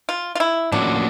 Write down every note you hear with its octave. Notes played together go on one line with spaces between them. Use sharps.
F4
F4
E4
A2 F3 A#3 C#4 D4 F#4